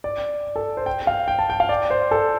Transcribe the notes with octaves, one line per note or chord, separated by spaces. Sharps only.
D5
A4
C5
G5
F5
G5
A5
G5
F5
D5
C5
A4